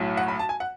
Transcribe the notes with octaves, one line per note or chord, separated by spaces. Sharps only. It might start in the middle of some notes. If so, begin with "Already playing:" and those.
Already playing: B1 A2 F#3
F#5
B5
A5
G#5
F#5